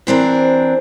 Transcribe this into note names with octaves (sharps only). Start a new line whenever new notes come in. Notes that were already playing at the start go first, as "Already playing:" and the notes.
E3 C4 D4 A#4